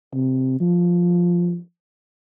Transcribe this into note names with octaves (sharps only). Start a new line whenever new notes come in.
C3
F3